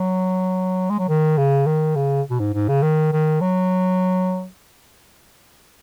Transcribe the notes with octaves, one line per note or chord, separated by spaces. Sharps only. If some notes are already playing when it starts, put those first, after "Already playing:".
Already playing: F#3
G#3
F#3
D#3
C#3
D#3
C#3
B2
G#2
G#2
C#3
D#3
D#3
F#3